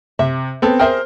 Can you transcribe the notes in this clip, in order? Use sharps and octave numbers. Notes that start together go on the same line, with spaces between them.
C3 E5
B3 C4 A4
G4 G#4 A#4 C5 E5